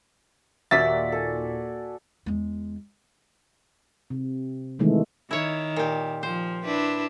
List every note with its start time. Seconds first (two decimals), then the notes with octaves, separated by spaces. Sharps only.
0.71 D#2 A#2 F#4 D5 E5 A6 B6
1.12 A4 G#5
2.26 E2 G#3
4.10 C3
4.79 C3 D#3 E3 G#3 A3
5.31 D#3 E4 C#5
5.76 A#2 G4
6.23 F3 C5
6.64 D4 E4 B4